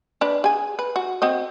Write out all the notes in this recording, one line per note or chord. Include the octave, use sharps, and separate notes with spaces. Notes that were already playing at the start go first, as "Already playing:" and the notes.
D4 B4
G#4 G#5
B4
F#4
C4 F#4 D#5